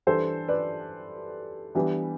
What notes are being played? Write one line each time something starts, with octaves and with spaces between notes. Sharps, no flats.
E3 G3 D4 A4 C5
B4 D5
E3 G3 B3 D4